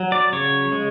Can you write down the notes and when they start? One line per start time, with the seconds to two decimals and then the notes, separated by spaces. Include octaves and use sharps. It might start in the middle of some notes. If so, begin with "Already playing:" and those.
Already playing: F#3
0.12 D5
0.33 C#3 C#5
0.72 G#3